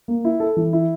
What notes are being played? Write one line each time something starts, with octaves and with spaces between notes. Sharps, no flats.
A#3
E4
A4
E3
E4